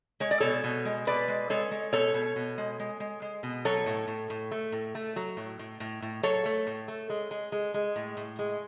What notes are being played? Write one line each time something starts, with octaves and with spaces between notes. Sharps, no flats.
G#3 C#5
D5
B2 A4 C#5
B2
G#3
B2 B4 D5
G#3
G#3 A4 C#5
G#3
B2 A4 C#5
B2
B2
G#3
G#3
G#3
G#3
B2
F#3 A4 C#5
A2
A2
A2
A3
A2
A3
F#3
A2
A2
A2
A2
F#3 A4 C#5
A3
A2
A3
G#3
G#3
G#3
G#3
A2
A2
G#3